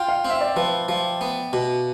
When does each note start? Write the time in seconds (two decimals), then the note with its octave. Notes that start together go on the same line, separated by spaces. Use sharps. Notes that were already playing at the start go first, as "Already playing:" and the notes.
Already playing: F4 G5
0.08 F5
0.25 C4 E5
0.41 D5
0.56 F3 B4
0.89 F3
1.21 B3
1.53 B2